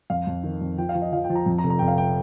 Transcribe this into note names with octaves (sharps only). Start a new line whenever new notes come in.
F2 F5
F2
D#3
F2
F3 G5
F5
F3
D#5
F3 F5
G5
F3
A#5
F2
A#5
F1
A#5
F1 G5
F5
G5